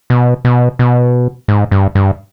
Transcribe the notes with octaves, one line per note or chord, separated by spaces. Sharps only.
B2
B2
B2
G#2
G2
G2